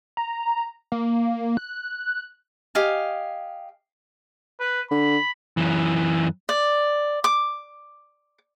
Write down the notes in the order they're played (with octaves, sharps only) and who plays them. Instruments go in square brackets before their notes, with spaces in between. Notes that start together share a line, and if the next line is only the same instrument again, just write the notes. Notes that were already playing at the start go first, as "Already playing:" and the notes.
[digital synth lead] A#5
A#3
F#6
[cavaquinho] G4 D#5 F5 G#5
[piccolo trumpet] B4
[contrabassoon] D3 [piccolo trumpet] B5
[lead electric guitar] F#2 E3
[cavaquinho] D5
D6